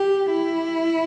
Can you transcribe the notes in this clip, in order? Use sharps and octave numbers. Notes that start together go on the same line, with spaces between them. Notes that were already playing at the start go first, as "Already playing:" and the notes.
Already playing: G4
E4